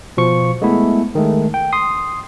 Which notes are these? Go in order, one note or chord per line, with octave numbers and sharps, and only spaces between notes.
B2 F3 C#6 C#7
G#3 A3 B3 E4
D#3 G#3 A3
G5
C6 D#6 C7